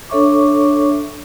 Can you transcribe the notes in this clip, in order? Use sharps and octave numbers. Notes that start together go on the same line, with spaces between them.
D4 A4 C#5 E5 C#6 D6